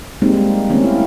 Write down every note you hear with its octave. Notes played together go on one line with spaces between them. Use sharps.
G3 G#3 A#3 C4 D#4
D#3 A3 A#3 C4 C#4
E4